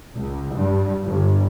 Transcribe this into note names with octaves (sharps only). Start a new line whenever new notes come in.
C#2
G2
G1